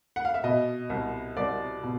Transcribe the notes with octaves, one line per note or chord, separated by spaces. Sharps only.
F#5
F5
E5
B2 D#5
C2
C2 D5
B2